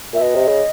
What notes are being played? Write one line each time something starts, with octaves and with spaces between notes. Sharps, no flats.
A#2 E5
B2 D#5
C3
C#3